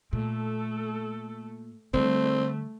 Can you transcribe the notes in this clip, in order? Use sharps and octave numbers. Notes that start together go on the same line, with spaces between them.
A#2 A3 A4
D3 G3 A3 C4